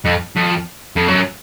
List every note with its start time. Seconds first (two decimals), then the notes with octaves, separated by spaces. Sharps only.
0.06 F2
0.36 F2
0.96 F2
1.08 F#2